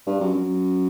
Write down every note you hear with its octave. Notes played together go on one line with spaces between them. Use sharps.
G2
F#2
F#2